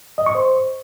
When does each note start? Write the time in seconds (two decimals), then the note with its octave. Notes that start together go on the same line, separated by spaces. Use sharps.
0.18 D#5
0.26 C#6
0.35 C5